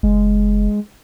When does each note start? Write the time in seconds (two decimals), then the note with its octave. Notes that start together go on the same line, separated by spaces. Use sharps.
0.03 F#1 G#3